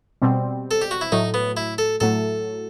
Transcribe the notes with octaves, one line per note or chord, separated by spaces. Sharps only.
B2 G3 C4
A4
G4
F#4
E4
A2 F#3 A3 D#4
B3
E4
A4
A2 F#3 A3 A4